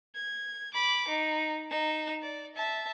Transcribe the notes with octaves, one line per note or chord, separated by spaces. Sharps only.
G#6
B5 D6
D#4
D#4 E7
D5
E5 A5